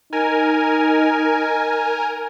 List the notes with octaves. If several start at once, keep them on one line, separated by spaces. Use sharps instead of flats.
D#4 A#4 G#5